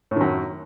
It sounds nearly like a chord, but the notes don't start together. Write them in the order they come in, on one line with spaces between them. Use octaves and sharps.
A2 D#3 F#2